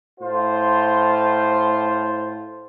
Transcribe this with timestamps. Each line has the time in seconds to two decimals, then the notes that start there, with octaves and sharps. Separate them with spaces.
0.20 A2 F4 C5